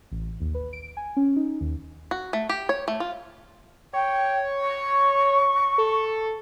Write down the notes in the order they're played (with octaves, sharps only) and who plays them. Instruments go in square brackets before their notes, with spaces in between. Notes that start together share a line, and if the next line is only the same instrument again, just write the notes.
[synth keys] A1
D#2
B4
D7
G#5
C#4
D#4
D#2
[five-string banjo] F#4
A3
G4
C#5
A3
F4
[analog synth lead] C#5 [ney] G5
[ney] C#6
[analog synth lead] A4